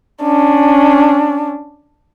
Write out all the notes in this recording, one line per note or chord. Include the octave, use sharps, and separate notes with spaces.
C#4 D4